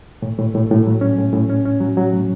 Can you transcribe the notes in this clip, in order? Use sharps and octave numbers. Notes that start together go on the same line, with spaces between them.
A2
A2
A2
A2
F#3
C#4
A2
A2
C#4
C#4
F#3
F#3
A2